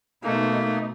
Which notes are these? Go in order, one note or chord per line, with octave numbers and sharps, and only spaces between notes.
B2 A3 A#3 D#4